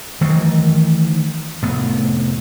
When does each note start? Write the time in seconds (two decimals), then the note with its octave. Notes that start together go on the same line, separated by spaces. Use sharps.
0.21 D#3 E3 F#3 A3
1.62 F1 A2 B3